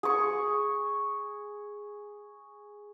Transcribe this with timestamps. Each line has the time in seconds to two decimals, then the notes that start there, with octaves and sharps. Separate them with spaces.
0.03 G#4 C#6